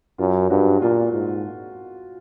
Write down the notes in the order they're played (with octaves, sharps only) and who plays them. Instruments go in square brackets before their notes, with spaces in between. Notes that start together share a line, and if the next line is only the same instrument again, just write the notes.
[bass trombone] F#2 [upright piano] F4
[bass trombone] G2 [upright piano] F#4
[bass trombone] A#2 [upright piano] F4
[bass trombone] G#2